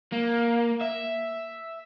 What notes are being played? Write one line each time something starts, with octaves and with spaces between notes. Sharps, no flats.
A#3
E5